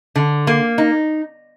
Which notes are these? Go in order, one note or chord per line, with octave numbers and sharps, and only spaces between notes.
D3
A#3
D#4